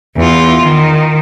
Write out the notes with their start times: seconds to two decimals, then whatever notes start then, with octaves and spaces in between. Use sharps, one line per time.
0.16 E2 F4
0.63 D#3